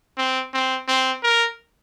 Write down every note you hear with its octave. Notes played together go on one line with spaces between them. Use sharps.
C4
C4
C4
A#4